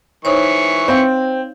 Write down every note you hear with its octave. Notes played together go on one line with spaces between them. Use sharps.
E3 D#4 C5 C#5 C#6
C4 F5